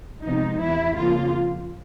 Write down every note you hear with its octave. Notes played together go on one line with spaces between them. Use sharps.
C3 F3 G#3 B3 D#4
E2 C3 E3 E4
F2 C#3 F3 A#3 F4